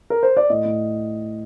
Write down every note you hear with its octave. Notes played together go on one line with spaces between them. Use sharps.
A#4
C5
D5
A2 D#5
A2